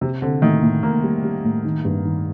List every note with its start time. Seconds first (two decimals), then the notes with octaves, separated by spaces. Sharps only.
0.01 C3 C4
0.22 D3 C4
0.42 A2 D#3
0.63 A2
0.83 A2 A#3
1.03 G3
1.24 G3
1.44 A2
1.65 D#3
1.85 G2
2.05 D#3